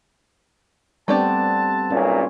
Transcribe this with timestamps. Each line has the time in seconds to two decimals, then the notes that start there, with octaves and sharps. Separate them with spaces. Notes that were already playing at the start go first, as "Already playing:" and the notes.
1.08 G3 A3 B3 C4 D4 G4 A5
1.90 B1 A#2 C#4